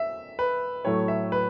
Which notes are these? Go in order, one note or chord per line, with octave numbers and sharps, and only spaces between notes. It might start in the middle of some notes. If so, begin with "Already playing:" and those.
Already playing: E5
B4
A2 F#3 A3 C#5
E5
B4